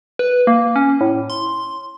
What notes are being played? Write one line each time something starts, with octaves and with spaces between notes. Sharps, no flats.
B4
A#3
C#4
A2
C6